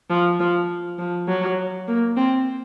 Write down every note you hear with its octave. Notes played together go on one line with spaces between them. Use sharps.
F3
F3
F3
F#3
A#3
C4